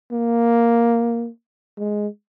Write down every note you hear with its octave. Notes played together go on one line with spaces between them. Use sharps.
A#3
G#3